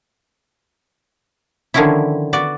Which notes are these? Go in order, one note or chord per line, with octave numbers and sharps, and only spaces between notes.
D3 D#3 F3 C#4 E4
B3 F#4 D5